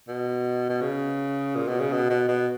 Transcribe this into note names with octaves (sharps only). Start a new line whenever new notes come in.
B2
B2
C#3
A#2
B2
C#3
B2
B2
B2